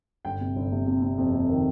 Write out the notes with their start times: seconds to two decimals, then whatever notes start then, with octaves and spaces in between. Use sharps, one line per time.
0.25 G1 G5
0.40 C3
0.56 G1
0.72 C3
0.87 C3
1.02 C3
1.18 F2
1.33 C3
1.49 D#3